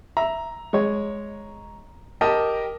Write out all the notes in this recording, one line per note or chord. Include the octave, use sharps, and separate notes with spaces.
E5 A#5
G#3 C#5
G4 A#4 D#5 A5